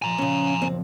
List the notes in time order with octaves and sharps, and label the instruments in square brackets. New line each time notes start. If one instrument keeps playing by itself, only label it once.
[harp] A#2 F3 [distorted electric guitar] G#5 A#5
[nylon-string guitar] C#3 C#4
[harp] F#1 [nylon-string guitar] C4